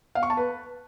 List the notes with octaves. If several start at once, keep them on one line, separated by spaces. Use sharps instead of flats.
F5
C#6
A5
B4